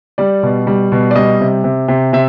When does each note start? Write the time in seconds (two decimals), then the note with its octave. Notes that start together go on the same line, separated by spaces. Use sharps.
0.18 G3 D5
0.43 B2
0.67 G3
0.92 B2
1.11 D5
1.16 G3 D#5
1.41 C3
1.64 C3
1.88 C3
2.13 C3 E5